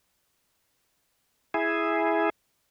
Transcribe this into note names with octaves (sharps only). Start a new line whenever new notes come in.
E4 G#4